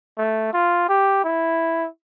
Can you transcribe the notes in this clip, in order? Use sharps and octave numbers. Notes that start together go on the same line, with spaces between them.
A3
F4
G4
E4